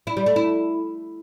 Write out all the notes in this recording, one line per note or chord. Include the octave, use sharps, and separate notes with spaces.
E4
G3
A3
E4